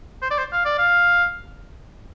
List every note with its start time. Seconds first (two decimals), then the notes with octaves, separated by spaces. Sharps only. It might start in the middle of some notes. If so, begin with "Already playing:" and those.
0.22 C5
0.31 D5
0.38 C5
0.52 F5
0.65 D5
0.79 F5